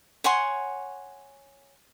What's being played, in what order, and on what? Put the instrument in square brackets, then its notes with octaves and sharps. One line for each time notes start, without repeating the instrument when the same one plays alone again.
[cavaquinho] C#5 F#5 G#5 C6